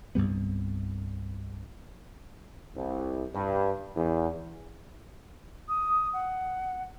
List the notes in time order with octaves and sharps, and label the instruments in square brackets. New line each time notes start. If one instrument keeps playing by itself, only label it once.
[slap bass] C2 G2 G3 B3
[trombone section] C2
G2
E2
[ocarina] D#6
F#5